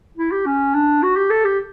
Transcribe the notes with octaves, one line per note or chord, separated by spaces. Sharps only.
E4
G4
C#4
D4
F#4
G4
A4
G4